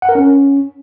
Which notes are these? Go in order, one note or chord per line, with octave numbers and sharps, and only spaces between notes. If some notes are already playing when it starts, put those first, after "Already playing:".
F#5
A#4
C#4